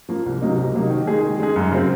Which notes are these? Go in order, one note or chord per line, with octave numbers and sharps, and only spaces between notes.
F3 A#3 F4
C2
C3 F#3 A#3 D#4
C2
C3 F#3 A#3 D#4
D#3
G#3 D#4 G#4
D#3
G#3 D#4 G#4
F#2
C#3 F#3 C4